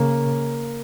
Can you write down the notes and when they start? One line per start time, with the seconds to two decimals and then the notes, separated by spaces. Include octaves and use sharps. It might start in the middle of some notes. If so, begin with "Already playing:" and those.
Already playing: C#3 A#3